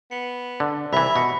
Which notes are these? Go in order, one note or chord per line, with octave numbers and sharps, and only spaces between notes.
B3 C#7
D3
C2 E3 E5 B5
B2 A#6 C#7